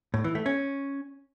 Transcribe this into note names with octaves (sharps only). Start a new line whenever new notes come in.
A2
E3
A3
C#4